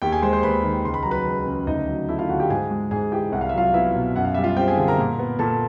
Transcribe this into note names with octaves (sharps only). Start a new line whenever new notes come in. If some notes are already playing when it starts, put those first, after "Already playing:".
D#2 G4 G5
G#4 G#5
G#3 C5 C6
C5 C6
D#2 B4 B5
D#3
C#2 C6
B5
F#3 A#5
B4 B5
C#2
C#3
D2 D#4 D#5
F#3
A3 E4 E5
F4 F5
D3 F#4 F#5
G4 G5
G#2 G#4 G#5
G#3
G#2 G#4 G#5
E3 G4 G5
C2 F#5
F5
E5
F#3 F4 F5
B3 E4 E5
B2
F#2 F#5
F5
G3 E5
F4 F5
C4 G4 G5
G#4 G#5
D3
A#4 A#5
A#2
B3
A#2 A4 A5